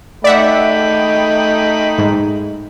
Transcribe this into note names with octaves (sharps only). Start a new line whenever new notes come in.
A3 D#4 D5 E5 F#5 G5 B5
G#2